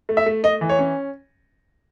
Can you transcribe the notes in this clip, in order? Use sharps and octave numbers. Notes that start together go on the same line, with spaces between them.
A3
E5
A3
A3 D#5
E3
C#5
C#4